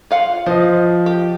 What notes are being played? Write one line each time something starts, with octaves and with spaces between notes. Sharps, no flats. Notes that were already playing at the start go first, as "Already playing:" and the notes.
F4 F5 F#5
F3 C5 D#5
G4